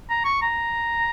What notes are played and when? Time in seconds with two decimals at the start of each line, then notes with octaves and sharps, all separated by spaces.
0.10 A#5
0.25 C#6
0.42 A#5